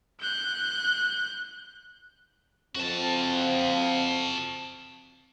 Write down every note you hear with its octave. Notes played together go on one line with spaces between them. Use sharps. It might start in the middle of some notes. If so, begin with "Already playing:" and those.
F#6 G6
F2 C4 F#4 A5